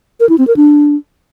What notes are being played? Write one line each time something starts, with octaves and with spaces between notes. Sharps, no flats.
A#4
E4
C4
A#4
D4